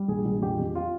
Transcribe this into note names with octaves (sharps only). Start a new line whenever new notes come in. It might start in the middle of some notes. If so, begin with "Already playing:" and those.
Already playing: G3
A#1 G#4
A#1
F2 G4
F2
F4